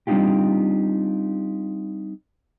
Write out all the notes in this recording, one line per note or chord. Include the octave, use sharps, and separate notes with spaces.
G3 C4 D4 D#4 F4 G4